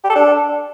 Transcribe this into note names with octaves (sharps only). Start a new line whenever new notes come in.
G4
A4
D4